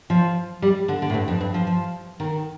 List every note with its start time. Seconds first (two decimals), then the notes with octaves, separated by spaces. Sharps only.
0.10 F3
0.62 G3
0.88 D3
1.02 D3
1.10 A2
1.14 G2
1.28 F2
1.41 G2
1.54 F3
1.67 F3
2.20 D#3